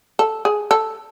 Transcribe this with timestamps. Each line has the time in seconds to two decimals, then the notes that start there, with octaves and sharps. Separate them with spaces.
0.19 A4
0.45 G#4
0.71 A4